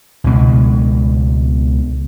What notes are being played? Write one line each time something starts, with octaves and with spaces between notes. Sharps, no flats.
C#2 B2 G#3